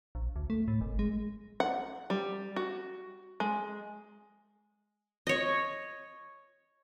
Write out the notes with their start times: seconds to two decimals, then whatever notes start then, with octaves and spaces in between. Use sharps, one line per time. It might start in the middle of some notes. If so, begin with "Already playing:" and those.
0.15 A#1
0.36 D2
0.50 A3
0.68 A2
0.81 G#1
0.99 G#3
1.60 F#5
2.10 G3
2.56 F#4
3.40 G#3
5.27 C#5 D#5